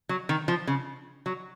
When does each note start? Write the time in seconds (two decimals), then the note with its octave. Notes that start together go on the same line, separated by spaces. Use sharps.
0.09 F#3
0.29 D#3
0.48 F3
0.67 C#3
1.26 F#3